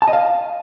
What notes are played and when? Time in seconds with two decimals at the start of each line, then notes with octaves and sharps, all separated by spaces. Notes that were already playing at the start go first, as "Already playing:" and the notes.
0.02 A5
0.07 D#5
0.13 F5